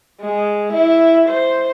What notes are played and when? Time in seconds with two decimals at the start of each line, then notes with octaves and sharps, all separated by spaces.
0.22 G#3
0.74 E4
1.30 C5